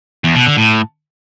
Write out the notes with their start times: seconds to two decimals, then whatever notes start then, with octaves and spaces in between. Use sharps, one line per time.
0.24 E2
0.35 B2
0.46 D3
0.57 A2